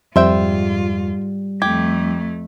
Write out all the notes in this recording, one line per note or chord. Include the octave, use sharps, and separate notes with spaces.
F2 G#2 G3 F4 C5 E5 G5
F2 A3 G4 G#6